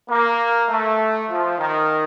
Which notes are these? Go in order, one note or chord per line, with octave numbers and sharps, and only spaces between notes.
A#3
A3
F3
D#3